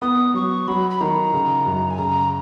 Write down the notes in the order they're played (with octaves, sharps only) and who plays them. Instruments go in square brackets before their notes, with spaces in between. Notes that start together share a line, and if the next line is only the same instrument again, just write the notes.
[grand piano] B3 [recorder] D#6
[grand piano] F#3 [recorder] C#6
[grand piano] F#3 [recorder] B5
[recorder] B5
[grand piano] D#3 [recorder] A#5
[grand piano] C#3
F#2
[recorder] G#5
[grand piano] C#3 [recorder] A#5